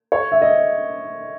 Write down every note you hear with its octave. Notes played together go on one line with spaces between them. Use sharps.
C#5
E5
D#5